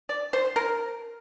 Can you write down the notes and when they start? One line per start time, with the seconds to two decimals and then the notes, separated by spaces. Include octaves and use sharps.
0.09 D5
0.33 C5
0.56 A#4